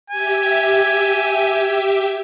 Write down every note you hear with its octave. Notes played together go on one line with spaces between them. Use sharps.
G4 E5 G#5